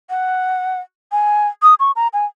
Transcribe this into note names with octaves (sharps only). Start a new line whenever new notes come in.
F#5
G#5
D#6
C#6
A#5
G#5